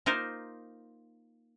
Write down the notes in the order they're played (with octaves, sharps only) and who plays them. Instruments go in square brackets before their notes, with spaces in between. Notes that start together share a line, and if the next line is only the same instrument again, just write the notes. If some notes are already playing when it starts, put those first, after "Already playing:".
[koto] A#3 D#4 F4 A#4 C5